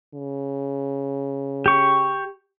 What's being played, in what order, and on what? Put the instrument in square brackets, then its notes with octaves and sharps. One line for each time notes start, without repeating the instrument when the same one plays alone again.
[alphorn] C#3
[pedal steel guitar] G4 C#6